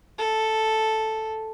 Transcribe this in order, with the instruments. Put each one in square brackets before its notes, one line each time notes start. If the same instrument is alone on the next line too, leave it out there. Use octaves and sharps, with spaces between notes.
[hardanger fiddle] A4